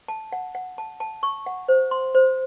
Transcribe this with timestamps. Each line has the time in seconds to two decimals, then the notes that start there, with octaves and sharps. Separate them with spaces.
0.08 A5
0.32 F#5
0.55 F#5
0.78 A5
1.00 A5
1.23 C#6
1.46 F#5
1.68 C5
1.91 C6
2.15 C5